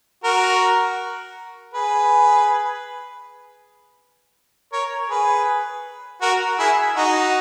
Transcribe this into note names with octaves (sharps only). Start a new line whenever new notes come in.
F#4 A#4
G#4 B4
A#4 C#5
G#4 B4
F#4 A#4
E4 G#4
D#4 F#4